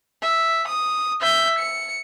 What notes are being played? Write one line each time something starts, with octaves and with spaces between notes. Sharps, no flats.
E5
D#6
E5 G6
C#7